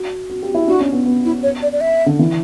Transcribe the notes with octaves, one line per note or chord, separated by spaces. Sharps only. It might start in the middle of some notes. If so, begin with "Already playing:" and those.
Already playing: F#4
F#4
G4
E4
D4 F#4
C#4
B3
B3
E4
C#5
D5
D5
E5
D3
E3